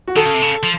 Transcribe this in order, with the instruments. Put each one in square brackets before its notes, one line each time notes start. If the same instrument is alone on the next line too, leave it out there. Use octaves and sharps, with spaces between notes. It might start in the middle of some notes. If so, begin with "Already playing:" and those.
[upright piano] F#4
[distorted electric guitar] D#3 [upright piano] A4
[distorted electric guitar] C#3
C3
C#3
F3